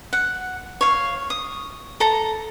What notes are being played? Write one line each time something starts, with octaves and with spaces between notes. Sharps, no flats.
F#5
C#5 F5
D#6
A4 A#5